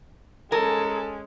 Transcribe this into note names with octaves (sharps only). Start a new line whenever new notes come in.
G#3 C#4 A4 A#4